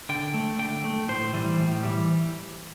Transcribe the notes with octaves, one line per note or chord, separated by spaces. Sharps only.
D3 G5
A3
D3 G5
A3
A2 C5
E3 G3
A2
E3 G3